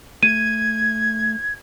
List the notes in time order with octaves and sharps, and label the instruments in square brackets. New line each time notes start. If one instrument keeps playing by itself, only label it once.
[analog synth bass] A3 [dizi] G#6 [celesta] D#7